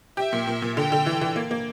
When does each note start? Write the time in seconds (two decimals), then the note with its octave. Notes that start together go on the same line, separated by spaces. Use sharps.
0.17 G4 E5
0.33 A#2
0.47 A#2
0.62 A#2
0.77 D3 G5
0.92 D3
1.06 E3
1.21 E3
1.36 A#3
1.51 A#3